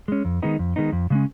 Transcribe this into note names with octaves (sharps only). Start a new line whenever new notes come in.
G#3 C#4
F2
D#3 G#3 B3 D#4
F2
D#3 G#3 B3 D#4
F2
C#3 G#3 C#4